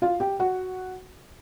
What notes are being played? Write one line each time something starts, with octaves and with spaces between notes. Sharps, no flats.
F4 F5
G4 G5
F#4 F#5